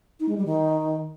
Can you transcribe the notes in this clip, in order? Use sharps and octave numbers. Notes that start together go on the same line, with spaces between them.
D#4
G#3
G3
D#3